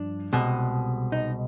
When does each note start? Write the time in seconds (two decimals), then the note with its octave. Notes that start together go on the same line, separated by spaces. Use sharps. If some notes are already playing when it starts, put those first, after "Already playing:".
Already playing: G2 F3 D4
0.33 C2 B2 G#3
1.12 D#4